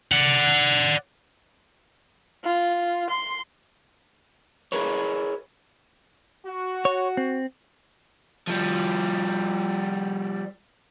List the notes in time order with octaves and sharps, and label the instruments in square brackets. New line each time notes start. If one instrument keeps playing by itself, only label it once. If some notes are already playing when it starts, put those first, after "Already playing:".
[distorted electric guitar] D5 F#5
[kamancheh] F4
C6
[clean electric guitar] G#4 A#4 B4 C#5
[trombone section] F#4
[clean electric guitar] C#5
C4
[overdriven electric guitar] F3 G3